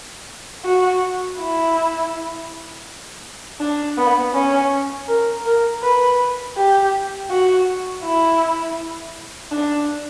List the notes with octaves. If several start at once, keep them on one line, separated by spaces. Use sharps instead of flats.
F#4
E4
D4
B3
C#4
A#4
A#4
B4
G4
F#4
E4
D4